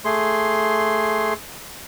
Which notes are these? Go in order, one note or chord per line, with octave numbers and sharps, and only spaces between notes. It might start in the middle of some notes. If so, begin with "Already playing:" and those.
A3 G#4 C6